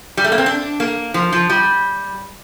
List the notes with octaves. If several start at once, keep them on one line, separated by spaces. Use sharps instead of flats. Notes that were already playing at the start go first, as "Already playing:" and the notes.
G3
A3
A#3
C4
D4
A#3
F3
F3
G3